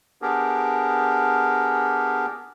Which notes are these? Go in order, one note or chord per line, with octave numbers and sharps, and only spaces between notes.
B3 D4 G4 G#4 A#4